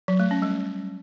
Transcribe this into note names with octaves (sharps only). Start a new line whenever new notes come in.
F#3
A3
C#4
G3